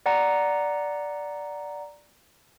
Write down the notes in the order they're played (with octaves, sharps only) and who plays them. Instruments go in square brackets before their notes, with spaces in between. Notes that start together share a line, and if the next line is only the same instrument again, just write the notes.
[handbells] D5 F#5 A#5